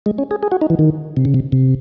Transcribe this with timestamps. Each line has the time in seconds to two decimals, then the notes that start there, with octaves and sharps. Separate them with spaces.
0.06 G#3
0.18 C#4
0.31 G#4
0.43 G#4
0.52 F#4
0.61 D#4
0.70 E3
0.79 D#3
1.17 C3
1.25 C#3
1.34 C3
1.52 C3